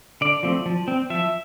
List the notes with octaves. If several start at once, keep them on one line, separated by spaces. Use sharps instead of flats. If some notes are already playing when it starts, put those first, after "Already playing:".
D3 D5
F3 A3 C4
F3
C4
F3 E5